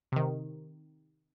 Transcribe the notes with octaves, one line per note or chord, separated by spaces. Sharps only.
C3 D#3